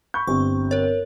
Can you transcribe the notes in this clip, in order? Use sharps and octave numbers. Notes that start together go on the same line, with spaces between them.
B5 C#6 G6
G1 C4 G4 C#6
A#4 C#5